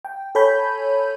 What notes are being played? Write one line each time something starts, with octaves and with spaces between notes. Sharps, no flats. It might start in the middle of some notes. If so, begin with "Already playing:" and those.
G5
A4 C#5 G#5 B5 G6